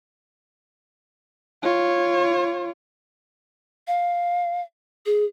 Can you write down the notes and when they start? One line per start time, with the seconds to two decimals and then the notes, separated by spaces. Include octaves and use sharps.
1.63 F4 C#5
3.87 F5
5.06 G#4